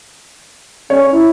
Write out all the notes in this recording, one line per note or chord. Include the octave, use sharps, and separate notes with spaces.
C#4 C#5
E4